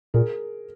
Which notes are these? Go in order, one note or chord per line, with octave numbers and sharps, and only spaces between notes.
A#2 G#4 A#4